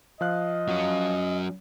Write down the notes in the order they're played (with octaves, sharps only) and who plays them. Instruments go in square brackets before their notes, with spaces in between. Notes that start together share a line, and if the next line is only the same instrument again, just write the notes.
[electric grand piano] F3 F5 F#6 [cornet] D#5
[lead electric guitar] F#3 C#4